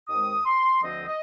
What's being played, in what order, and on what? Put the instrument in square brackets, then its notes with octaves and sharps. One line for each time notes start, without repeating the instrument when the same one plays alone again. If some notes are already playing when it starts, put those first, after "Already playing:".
[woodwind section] D#2 D#3 G#3 C4 D#6
C6
D2 D3 F3 C4 D#5
D#5